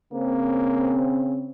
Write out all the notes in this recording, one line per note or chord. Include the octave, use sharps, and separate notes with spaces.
C#3 A#3 C4